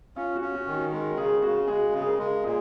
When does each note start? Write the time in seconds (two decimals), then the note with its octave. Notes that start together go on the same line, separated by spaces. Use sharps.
0.16 C#4 F4
0.36 F#4
0.41 C#4
0.54 F#4
0.67 D#3
0.74 F#4
0.92 G#3 A#4
1.17 C#3 G#4
1.42 C#3 F#4
1.68 G#3 G#4
1.93 C#3
2.01 G#4
2.06 A#4
2.19 G#3
2.44 A#2 G#4